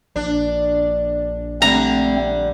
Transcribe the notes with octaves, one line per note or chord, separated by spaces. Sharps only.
A#1 D4
D3 G3 A3 C4 A#5